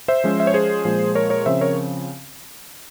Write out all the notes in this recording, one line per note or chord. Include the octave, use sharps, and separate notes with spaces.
C5 E5
F3 G#3 C#4
E5
C#5
G#4 C5
A#2 F3 G#3
A#4 C#5
A#4 C#5
C#3 F3 C4 C5 E5
A#4 C#5